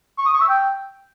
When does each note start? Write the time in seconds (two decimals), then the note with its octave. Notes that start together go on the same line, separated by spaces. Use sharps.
0.18 C#6
0.26 D#6
0.33 C#6
0.41 E6
0.49 G5